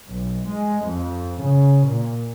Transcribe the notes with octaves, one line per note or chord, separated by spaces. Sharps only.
B1
G#3
F2
C#3
A#2